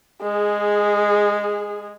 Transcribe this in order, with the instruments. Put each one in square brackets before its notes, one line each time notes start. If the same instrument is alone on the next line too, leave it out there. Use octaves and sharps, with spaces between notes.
[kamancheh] G#3 G#4